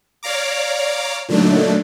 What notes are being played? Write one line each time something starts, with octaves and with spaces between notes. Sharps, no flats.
C#5 D5 F5 A#5 D6
A#2 D3 F#3 A3 D4 D#4